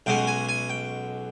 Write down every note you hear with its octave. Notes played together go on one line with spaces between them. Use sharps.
B1 B2 G#3 C#4 G5
G#5
G#5
G5